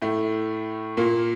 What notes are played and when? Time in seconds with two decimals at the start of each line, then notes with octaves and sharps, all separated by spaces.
0.02 A2 A3
0.97 A#2 A#3